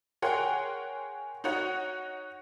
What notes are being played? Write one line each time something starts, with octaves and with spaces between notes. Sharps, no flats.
G#4 A#4 C#5 F#5 G5 C6
D#4 F#4 C#5 F#5